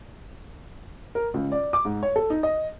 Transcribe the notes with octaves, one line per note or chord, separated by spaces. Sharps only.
A#4
C#2
D5
D6
G#2
C#5
A4
D#4
D#5